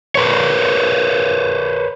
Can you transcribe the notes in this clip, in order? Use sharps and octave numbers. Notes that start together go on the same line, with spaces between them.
A#4 B4 C#5